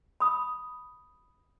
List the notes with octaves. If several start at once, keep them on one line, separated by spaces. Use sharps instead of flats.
B5 D#6